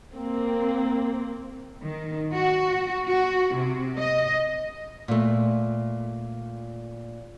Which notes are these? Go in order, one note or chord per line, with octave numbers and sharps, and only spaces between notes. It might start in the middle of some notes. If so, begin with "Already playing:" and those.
A#3 C4
D#3
F#4
F#4
C3
D#5
A#2 A3